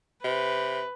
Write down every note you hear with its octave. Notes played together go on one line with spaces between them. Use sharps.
C3 B4